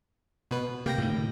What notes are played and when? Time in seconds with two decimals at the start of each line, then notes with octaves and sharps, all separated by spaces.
0.51 B2 B4
0.86 C3 A#3 G5 A#6
0.98 A2 D3 D#3